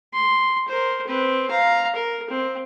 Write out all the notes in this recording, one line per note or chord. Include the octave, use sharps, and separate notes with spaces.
C6
A#4 C5
C4 B4
F5 A#5
A#4
C4